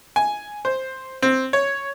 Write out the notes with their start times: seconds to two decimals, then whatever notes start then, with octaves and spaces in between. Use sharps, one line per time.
0.16 G#5
0.65 C5
1.22 C4
1.53 C#5